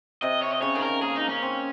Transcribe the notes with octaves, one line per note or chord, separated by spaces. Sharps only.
C3 D#5
C#5
D#5
C#3 C#5
D#3 G#4
A#4
C#3
A#3 G#4
D#4
C#4
C4